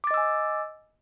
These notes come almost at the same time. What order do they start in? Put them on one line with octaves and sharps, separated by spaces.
D6 A6 D#5 E6 G#5